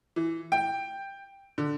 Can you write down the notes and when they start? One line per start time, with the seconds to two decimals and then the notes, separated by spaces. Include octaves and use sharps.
0.16 E3
0.52 G5
1.58 D3